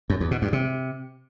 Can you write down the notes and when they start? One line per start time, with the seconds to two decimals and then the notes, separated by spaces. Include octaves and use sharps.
0.10 F#2
0.20 E2
0.31 B2
0.42 G2
0.53 C3